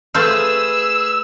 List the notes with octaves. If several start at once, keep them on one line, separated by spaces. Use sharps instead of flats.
A3 G#4 B4 C5 F5 E6